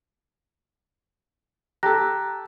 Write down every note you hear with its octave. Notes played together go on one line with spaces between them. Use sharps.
G4 A4 A#5 F#6 A#6